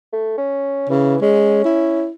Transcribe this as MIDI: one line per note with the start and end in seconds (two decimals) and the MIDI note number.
0.13 0.33 57
0.38 0.89 61
0.90 1.16 49
0.90 1.20 52
1.22 1.63 56
1.22 2.04 61
1.65 2.11 64